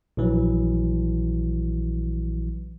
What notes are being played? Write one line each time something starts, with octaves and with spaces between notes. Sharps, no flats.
A#1 E3 F#3